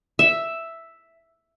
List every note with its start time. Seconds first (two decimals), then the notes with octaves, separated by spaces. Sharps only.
0.19 E5